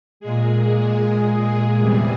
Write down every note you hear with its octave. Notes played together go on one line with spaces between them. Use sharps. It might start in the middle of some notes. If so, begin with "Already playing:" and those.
A#2 G#3 G#4
A#2 G#3 G#4
A#2 G#3 G#4
E2 C3 E3 G3